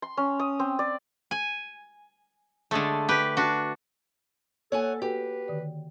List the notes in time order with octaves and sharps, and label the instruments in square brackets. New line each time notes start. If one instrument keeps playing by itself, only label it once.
[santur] C6
C#4
D#6
C4
D5
[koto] G#5
D3 G#3 A3
G4 B4
D4 F#4
[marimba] A#3 [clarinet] A4 [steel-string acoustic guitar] C#5 F#5 G#5
[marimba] F#4 A4 [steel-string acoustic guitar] G4 [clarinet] B4
[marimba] D3 D#3 D5